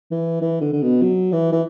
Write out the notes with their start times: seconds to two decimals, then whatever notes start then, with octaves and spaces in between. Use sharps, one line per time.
0.11 E3
0.41 E3
0.61 D3
0.73 D3
0.82 B2
1.02 F#3
1.32 E3
1.52 E3